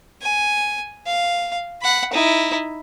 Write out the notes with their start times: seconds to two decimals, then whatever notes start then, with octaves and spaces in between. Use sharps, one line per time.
0.22 G#5
1.06 F5
1.82 F#5 B5
2.13 D#4 E4